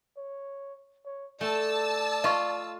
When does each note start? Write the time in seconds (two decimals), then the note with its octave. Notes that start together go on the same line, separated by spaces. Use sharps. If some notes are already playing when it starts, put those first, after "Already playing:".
0.17 C#5
1.05 C#5
1.41 A3 D5 A5 E6
2.24 F4 D#5 C#6